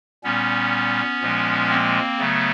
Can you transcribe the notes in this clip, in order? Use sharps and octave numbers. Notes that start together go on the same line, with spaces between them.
A#2 G3 B3 C#4
A#2 F3 G#3
A#3 C4
C#3 F#3 A3 B3